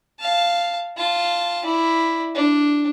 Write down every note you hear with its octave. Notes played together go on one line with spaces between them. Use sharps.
F5 A5
F4 A5
E4 D5
D4